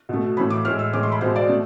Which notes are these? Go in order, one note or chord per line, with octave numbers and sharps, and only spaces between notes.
B2 A3
A2 E3 A3 B5
D6
A2 G#3 F6
E6
A2 E3 G#3 D6
C6
B5
B2 G#3 C5
D5
A3